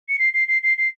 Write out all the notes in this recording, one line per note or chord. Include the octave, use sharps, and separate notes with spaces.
C#7
C7
C7
C7
C7
C7